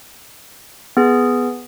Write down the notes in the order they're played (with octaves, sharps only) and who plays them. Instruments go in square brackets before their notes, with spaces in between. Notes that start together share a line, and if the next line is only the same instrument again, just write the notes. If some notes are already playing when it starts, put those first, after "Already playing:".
[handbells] B3 G#4